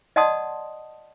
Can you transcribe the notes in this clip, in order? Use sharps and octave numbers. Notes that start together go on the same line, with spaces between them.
D5 D#5 F#5 A5 C6 D#6